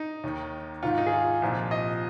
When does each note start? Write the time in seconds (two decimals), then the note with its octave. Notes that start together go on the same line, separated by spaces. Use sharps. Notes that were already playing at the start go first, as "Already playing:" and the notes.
Already playing: D#4
0.23 D#2 D#3
0.83 G#2 D#3 F4
0.98 D#4
1.06 G#4
1.12 F4
1.42 C2 A#2 F3
1.71 D#5